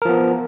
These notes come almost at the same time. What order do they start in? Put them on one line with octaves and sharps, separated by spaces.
A#4 F3 B3